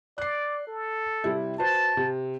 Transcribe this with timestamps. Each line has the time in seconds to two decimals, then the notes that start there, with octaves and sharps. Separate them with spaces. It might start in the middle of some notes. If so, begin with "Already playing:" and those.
0.18 D5 F#6 C7
0.67 A4
1.24 C3 G3 E4
1.59 F#4 B4 C5 A5
1.97 C3